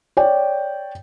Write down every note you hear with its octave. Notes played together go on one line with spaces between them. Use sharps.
C#5 D5 G5